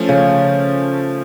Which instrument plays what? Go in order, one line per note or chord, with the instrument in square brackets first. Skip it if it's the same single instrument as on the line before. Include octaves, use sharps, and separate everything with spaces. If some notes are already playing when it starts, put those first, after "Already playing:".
Already playing: [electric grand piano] F3 A3 C#4
[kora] C#3